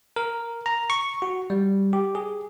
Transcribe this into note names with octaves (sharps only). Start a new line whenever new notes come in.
A#4
A#5
C#6
F#4
G3
G4
G#4